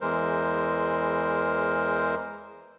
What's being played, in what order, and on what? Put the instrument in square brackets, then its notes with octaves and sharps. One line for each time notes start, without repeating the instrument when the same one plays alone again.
[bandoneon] E2 E3 G#3 A#4 C5